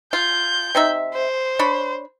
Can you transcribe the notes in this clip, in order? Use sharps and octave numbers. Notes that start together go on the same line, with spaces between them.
F4 G6
C3 D#4 E5
C5
D4 C#5 B5